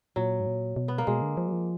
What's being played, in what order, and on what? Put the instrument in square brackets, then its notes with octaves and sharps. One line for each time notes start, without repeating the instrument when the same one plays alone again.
[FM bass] A#2 [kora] F#3
[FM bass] G#2
A#2
B2
[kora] B3
A#3
[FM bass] B2 [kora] G#3
[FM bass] D3
F3
F#3
F3